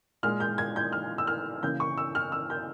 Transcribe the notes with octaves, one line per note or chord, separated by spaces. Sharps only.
A#2 G#3 F6
G6
G#6
G6
F6
E6
F6
C#3 E3 A#3 G6
C#6
E6
F6
E6
G6